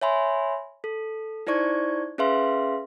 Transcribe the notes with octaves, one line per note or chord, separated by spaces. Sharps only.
C#5 E5 G#5 B5 C6
A4
D#4 E4 C5 D5 C#6 G#6
C#4 G#4 B4 E5 F5 C6